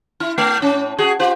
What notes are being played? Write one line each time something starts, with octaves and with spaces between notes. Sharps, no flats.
E4
A3
A2 C#4
F#4 G#4
F4 G4 C5